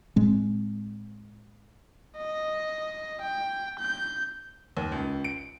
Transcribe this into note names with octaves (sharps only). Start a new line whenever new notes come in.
A2 G#3 C4
D#5
G5
G6
D#2
C#2
D7